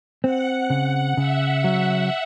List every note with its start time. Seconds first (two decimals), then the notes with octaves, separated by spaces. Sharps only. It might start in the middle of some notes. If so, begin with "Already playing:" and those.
0.24 C4 F#5
0.70 C#3
1.17 C#3 E5
1.64 F#3